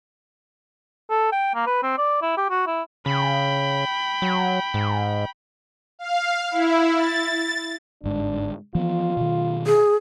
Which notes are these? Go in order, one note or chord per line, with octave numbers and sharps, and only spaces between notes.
A4
G5
A#3
B4
C4
D5
E4
G4
F#4
E4
C#3 G5 B5
F#3
G#2
F5
E4
A6
G1 G#2 D4
E3 F3 B3 F4
B2 D#3
G#4